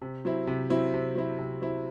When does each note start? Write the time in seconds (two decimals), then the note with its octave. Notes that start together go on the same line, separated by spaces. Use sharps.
0.02 C3
0.25 F#3 C4 E4
0.47 C3
0.70 F#3 C4 E4
0.94 C3
1.15 F#3 C4 E4
1.39 C3
1.61 F#3 C4 E4